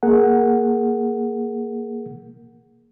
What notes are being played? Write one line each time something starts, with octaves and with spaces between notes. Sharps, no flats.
A#3 G#4 A#4 F#5